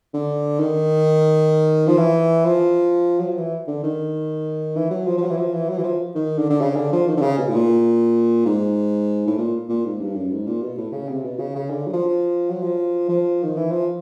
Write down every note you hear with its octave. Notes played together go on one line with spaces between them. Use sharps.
D3
D#3
F3
E3
F3
F#3
F3
E3
D3
D#3
E3
F#3
F3
F3
F#3
E3
F3
E3
F#3
E3
F3
D#3
D3
D3
C#3
D3
F3
D#3
D3
C#3
B2
A2
A#2
G#2
A2
A#2
A#2
G#2
G2
F#2
G#2
A#2
B2
A2
C#3
C3
B2
C#3
C#3
D3
F#3
F3
F#3
F3
F3
D#3
E3
F3